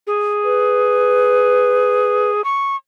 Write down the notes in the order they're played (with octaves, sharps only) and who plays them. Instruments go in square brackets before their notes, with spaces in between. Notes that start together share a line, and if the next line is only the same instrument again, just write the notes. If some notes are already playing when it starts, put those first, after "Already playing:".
[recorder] G#4
[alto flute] B4
[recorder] C#6